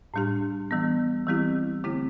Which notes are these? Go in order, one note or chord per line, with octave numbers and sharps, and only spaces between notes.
A2 G3 D4 G4
E3 G3 B3
E3 G3 C4 E4 G4
D3 A3 C4 E4 G4